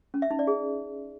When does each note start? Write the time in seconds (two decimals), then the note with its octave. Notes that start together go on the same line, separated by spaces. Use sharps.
0.14 C#4
0.22 E5
0.31 D#4
0.39 D5
0.47 G#4